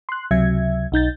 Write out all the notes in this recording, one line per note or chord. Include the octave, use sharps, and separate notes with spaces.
C6 F#6
C#2 C3 F#3 E5 G#6
B1 D#4 G6 A6